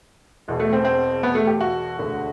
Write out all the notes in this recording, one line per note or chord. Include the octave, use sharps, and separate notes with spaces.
E1 E2 B2
A3
C4
C4
B3
A3
G4
F#4
E1 D2 D3